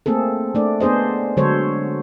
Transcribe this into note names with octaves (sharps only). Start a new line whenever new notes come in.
A3 A#3 C4 G#4 A4
A3 D4 D5
B3 D4 G#4 C5 D#5
D3 F#3 G#3 A4 C5 C#5